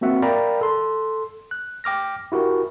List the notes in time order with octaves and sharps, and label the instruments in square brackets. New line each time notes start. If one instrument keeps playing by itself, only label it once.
[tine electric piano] A#3 C4 F#4 E5 F#5
A#4 D5 F5 G5 A#5 B5
A4 C6
F#6
G5 D6 F6 A#6
E4 F#4 G4 A#4